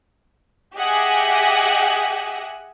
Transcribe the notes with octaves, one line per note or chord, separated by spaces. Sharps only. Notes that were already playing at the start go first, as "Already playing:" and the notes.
G4 G#4 D#5 E5 F#5 G#5